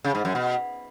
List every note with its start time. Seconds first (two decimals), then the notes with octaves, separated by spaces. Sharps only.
0.04 C#3
0.15 G#2
0.25 F#2
0.35 B2